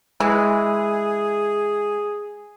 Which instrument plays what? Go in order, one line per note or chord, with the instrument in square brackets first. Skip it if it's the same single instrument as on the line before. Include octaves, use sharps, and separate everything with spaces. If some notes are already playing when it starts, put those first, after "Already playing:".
[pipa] E3 [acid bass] G#3 [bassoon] G#4